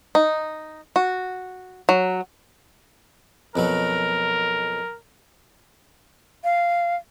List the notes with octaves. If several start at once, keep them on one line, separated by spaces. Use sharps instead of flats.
D#4
F#4
F#3
F2 B2 F#3 A#4
F5